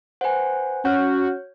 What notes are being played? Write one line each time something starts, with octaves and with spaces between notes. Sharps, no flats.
B4 C5 F#5 G#5
C#4 F#4 C#5 F6 G6